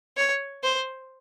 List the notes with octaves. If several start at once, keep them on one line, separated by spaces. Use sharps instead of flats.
C#5
C5